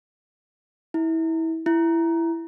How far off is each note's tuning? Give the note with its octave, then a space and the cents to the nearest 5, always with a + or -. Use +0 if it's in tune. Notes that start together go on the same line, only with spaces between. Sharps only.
E4 -25
E4 +10